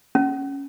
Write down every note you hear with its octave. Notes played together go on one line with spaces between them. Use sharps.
C#4